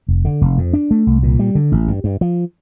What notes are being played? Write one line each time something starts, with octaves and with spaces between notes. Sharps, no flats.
F1
D3
F1
F2
D4
A3
C2
A#2
G3
D3
A1
G2
G2
F3